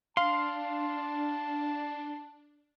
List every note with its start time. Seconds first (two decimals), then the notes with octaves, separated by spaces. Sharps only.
0.17 D4 F5 A5 C6